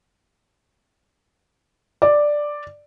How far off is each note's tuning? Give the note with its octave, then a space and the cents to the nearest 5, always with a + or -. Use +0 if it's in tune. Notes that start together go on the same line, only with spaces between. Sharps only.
D5 +5